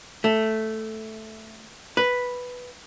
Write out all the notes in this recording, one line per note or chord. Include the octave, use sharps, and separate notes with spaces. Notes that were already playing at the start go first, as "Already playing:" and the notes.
A3
B4